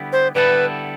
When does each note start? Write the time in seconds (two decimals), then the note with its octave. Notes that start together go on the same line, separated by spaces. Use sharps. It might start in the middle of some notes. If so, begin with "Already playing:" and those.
Already playing: D3 G3 B3 E4
0.13 C5
0.35 D3 G3 B3 E4 A4 B4